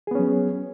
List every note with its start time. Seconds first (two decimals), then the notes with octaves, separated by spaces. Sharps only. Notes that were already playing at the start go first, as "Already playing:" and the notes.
0.07 G#4
0.11 B3
0.15 C#4
0.19 F#3